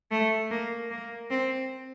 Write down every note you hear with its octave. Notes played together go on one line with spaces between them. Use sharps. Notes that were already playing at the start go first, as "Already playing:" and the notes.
A3
A#3
A#3
C4